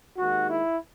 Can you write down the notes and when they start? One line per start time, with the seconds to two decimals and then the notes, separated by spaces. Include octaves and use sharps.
0.17 D#2 D#3 G#3 F#4
0.49 E4